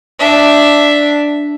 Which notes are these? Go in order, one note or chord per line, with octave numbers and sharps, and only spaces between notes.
D4 E5